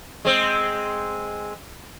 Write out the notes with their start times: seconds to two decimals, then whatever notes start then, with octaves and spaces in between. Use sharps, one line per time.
0.25 G#3 C4